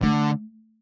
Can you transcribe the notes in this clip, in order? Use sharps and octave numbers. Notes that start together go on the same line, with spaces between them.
D3 A3